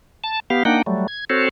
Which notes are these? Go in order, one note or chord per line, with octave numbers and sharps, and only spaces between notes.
A5
B3 G4 F5
A#3 D4 D#4 F#5 G5
F#3 G3 A3
G#6
C4 F#4 A4 C5 C#5